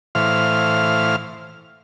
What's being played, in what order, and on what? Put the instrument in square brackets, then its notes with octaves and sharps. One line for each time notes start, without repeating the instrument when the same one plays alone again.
[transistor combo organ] A2 E3 C5 F5 F6